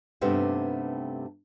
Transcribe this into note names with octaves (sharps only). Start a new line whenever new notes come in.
G2 C3 A3 B3 D#4 G4